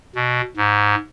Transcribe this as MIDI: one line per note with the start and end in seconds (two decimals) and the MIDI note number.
0.16 0.41 47
0.56 0.95 44